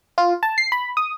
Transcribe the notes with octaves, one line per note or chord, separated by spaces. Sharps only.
F4
A5
C7
B5
D#6